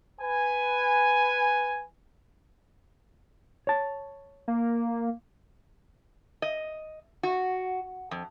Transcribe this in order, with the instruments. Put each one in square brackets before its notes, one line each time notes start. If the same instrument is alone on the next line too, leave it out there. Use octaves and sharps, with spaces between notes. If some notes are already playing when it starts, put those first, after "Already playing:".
[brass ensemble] B4 G#5
[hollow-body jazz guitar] C#5 A5
[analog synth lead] A#3
[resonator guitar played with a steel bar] D#5
F#4
F2